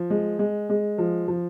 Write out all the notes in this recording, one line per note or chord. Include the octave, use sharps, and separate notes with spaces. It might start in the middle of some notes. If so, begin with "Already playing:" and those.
Already playing: F3
G#3
G#3
G#3
F3
F3